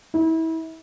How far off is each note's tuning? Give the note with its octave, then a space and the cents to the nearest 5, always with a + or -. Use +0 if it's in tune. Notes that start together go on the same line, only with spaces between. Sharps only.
E4 -30